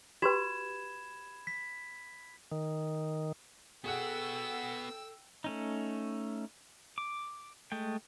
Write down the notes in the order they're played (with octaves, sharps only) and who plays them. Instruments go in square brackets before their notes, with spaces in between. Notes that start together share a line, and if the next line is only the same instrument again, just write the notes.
[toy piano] F#4 G4 B4 [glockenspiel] B5 G#6 E7
[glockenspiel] B6
[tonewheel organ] D#3
[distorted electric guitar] B3 F#4 [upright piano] G#4 F#5 [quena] A4 [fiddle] G5 E6
[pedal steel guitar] A3 C#4 D#4
D6
G#3 A3 G5